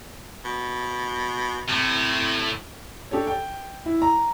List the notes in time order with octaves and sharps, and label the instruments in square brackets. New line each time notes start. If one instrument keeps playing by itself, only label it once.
[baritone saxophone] B2
[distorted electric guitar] A2 A3 [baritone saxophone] C3
[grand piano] D4 G4 A4 C#5
G5
E4
A#5